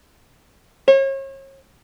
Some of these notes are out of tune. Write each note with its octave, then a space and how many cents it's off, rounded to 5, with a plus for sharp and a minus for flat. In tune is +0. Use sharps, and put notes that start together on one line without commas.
C#5 -40